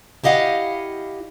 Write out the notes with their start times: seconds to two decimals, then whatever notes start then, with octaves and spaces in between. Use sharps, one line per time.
0.24 E4 G4 D#5 F5 F#5